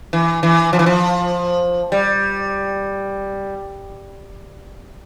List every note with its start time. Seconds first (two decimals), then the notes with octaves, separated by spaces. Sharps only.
0.13 E3
0.43 E3
0.73 F3
0.79 E3
0.86 F3
1.92 G3